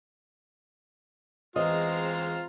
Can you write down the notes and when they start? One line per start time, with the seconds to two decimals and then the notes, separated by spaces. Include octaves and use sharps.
1.56 E2 E3 G#3 C4 F4 D#5 A#5